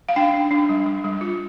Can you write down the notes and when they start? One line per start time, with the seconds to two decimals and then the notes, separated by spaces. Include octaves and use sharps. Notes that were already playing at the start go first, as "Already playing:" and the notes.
0.09 F5
0.16 D4 G5
0.34 D4
0.51 D4
0.69 G3
0.86 G3
1.04 G3
1.21 F4